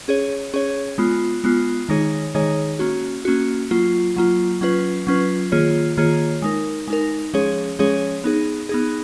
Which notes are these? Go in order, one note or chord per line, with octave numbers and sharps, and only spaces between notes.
C#4 G#4 C#5
C#4 G#4 C#5
G#3 B3 F4
G#3 B3 F4
D#3 G#3 D#4 G#4 C#5
D#3 G#3 D#4 G#4 C#5
A#3 C#4 F#4
A#3 C#4 F#4
F#3 A#3 F4
F#3 A#3 F4
F#3 C#4 F4 B4
F#3 C#4 F4 B4
D#3 A#3 F4 G#4 C#5
D#3 A#3 F4 G#4 C#5
G#3 D#4 A#4
G#3 D#4 A#4
F3 G#3 C#4 G#4 C#5
F3 G#3 C#4 G#4 C#5
B3 D#4 G#4
B3 D#4 G#4